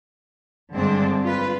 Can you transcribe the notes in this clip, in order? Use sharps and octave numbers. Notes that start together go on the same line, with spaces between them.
G2 D3 G#3 C4 D4
F4 B4